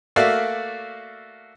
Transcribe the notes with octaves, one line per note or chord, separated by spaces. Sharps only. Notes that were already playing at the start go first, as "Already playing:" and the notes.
A3 A#3 F#4 D5 E5 F5